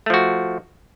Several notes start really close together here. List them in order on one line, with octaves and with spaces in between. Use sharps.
A3 F3 F#4